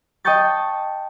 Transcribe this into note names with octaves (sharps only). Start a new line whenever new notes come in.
D#5 G5 A5 C#6 G6 A6